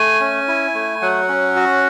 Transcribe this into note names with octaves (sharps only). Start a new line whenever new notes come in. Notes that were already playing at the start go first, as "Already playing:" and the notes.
Already playing: A3 G#5
C#4
E4
A3
F#3 F#5
C#4
F#4